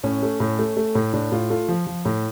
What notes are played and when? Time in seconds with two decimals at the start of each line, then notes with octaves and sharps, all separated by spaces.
0.03 A2 C#4
0.23 A3
0.40 A2
0.59 A3
0.77 A3
0.95 A2
1.13 A2 D4
1.32 A2 F4
1.50 A3 F4
1.68 F3
1.87 F3
2.05 A2